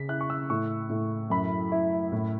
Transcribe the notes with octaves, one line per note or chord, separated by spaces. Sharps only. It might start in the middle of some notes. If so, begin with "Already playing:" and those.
Already playing: C#3 B6
E4 F#6
C#6
E6
A2 C#6
A2
F#2 B5
E4
A2